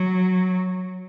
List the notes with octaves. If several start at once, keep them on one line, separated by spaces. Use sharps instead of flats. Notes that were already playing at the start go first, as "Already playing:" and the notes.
Already playing: F#3